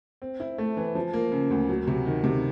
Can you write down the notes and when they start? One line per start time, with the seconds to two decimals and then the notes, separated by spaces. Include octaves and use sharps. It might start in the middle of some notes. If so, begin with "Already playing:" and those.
0.22 C4
0.40 E4
0.58 A3
0.77 E3
0.95 F3
1.13 A#3
1.32 C#3
1.50 D2
1.69 F#3
1.87 C3
2.06 D#3
2.24 C3